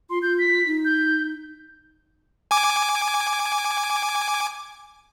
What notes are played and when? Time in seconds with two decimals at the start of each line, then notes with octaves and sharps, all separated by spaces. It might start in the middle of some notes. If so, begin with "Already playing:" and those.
0.10 F4 C6
0.22 F4 G6
0.39 B6
0.67 D#4
0.85 G6
2.51 G#5 D6